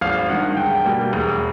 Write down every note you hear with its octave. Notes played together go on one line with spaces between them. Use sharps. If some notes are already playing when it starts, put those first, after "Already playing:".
G#1 F5
G2 D#3 F#5
C#2 G5
B2 G3 A#3
E1